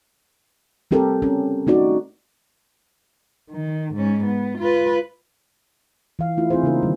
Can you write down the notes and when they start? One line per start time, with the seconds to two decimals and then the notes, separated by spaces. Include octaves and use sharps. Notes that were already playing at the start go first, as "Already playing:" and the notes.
0.91 G3 C4 G4 A4 A#4
1.22 C#4
1.67 A3 D#4 F#4 D5
3.51 D#3
3.94 G#2 C#4
4.24 B3
4.58 F4 B4
6.19 E3 F5
6.37 A3 E4 F4
6.50 C4 E4 F4 G#4 C5
6.63 C#3 A#3 C#4 D#4 A#4
6.82 D#3 G3